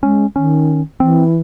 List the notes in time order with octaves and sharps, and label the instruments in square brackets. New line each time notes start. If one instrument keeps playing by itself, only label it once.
[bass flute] G#3 [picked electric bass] C#4
[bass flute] D#3 [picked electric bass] C#4
[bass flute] E3 [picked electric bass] C4